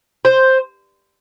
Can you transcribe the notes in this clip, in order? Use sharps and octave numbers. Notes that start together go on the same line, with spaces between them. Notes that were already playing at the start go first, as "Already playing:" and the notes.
C5